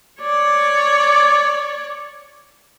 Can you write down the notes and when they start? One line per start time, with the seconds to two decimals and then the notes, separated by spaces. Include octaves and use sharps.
0.22 C#5 D5